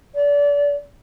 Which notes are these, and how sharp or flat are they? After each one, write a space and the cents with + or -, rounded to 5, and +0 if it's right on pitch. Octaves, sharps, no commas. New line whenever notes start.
D5 -30